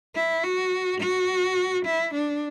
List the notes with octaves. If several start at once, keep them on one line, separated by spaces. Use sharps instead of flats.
E4
F#4
F#4
E4
D4